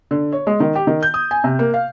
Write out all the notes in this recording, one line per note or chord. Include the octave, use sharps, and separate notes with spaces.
D3
C#5
G#3
D#3
G4
D#3
G6
D#6
G#5
C3
A#3
F5